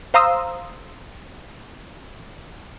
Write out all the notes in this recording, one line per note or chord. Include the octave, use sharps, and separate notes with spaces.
C5 F5 A#5 C6 D#6 E6